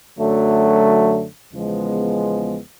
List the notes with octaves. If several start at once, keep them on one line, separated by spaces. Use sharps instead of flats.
F#2 D3 F#3 A3
E2 C#3 F3 G#3 B3